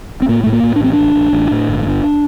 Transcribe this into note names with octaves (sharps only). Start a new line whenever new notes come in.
C4
A2 A#3
A2 A3
A#3
A2
D4
A1 C4
D4
A1
A1
A1
A2
G1
G1